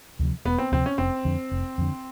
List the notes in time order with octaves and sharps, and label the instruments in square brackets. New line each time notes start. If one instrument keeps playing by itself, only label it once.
[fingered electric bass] D2 C3 F3
[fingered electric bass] E1 [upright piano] B3
[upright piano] C4
[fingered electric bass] D2 C3 F3 [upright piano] C4
[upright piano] C#4
[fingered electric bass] F1 [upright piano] C4
[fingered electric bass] F2 D3
F1
F2 D3